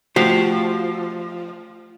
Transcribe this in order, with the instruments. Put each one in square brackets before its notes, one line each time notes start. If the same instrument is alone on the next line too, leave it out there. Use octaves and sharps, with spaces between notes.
[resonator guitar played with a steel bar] F3 [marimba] A3 [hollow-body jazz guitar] F#4 G4 C5